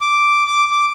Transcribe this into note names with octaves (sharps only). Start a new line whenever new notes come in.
D6
D6
D6